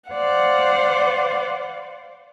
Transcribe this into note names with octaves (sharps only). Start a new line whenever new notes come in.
C5 D5 F5 F#5